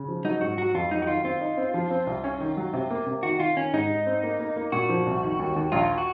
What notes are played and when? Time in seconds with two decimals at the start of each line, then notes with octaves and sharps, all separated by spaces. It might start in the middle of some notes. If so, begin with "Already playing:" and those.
Already playing: C#3
0.08 F3
0.24 F#3 D#4
0.41 G#2 F#4
0.58 F#3 F#4
0.74 F2 F4
0.91 F#3 D#4
1.02 F#4
1.07 D#3 F4
1.24 C4 F4
1.41 D#4
1.57 C4
1.74 F3
1.90 C4
2.07 C2
2.24 C#4
2.41 D#3
2.57 F#3
2.73 C3
2.91 A#3
3.07 C3
3.23 D#3 F#4
3.40 D#3 F4
3.57 D#3 C#4
3.73 G#2 D#4
3.90 G#2
4.06 C4
4.23 A#3
4.40 A#3
4.56 A#3
4.72 A#2 F#4
4.89 F3
5.07 C2
5.23 D#3
5.39 D#2
5.56 D#2
5.72 A#1 F4
5.98 F#4